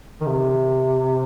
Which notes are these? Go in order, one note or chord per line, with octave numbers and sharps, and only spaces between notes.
D#3
C3